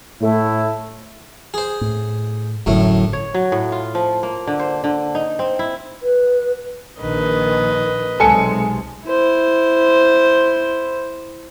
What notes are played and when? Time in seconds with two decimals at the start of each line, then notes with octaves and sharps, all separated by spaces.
0.20 A2 A3 E4
1.54 G#4 C5
1.81 A2
2.66 G1 F#2 A2 D3 A3
3.13 C#5
3.34 F#3
3.52 A2
3.72 F4
3.95 F3
4.23 A#3
4.47 D3
4.59 C5
4.84 D3
5.15 D#4
5.39 C4
5.59 E4
6.03 B4
6.99 A#1 A#2 D#3 B4 D#5
8.20 B1 C3 G#3 A4 G#5 C#7
9.06 E4 C5